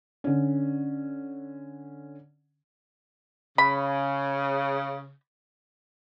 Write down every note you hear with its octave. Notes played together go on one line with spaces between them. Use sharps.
D3 C#4
C#3 B5